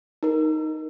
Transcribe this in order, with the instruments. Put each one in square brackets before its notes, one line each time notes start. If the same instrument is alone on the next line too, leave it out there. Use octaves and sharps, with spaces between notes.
[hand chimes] D#4 A#4